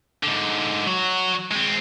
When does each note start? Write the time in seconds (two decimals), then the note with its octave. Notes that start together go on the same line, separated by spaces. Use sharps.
0.23 G#2 D3
0.87 F#3 F#4
1.52 G#3 C4